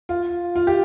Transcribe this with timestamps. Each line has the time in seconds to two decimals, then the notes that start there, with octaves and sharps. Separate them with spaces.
0.09 F4
0.56 F4
0.67 G4